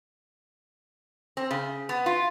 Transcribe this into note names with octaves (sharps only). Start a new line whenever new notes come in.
C4
C#3
B3
F4